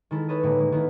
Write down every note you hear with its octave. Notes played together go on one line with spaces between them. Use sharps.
D#3 G#3 E4 A4
A4 B4 C#5 D#5
A2 D3 G#3 A#3
G#3
D#3 A3 B3 D#4 E4